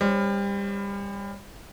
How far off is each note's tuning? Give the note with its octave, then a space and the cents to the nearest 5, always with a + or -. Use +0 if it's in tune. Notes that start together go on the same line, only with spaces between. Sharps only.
G3 +30 C#4 +0 C5 +0